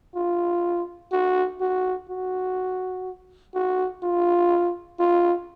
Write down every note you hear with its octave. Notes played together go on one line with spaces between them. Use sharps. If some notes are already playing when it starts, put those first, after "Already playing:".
F4
F#4
F#4
F#4
F#4
F4
F4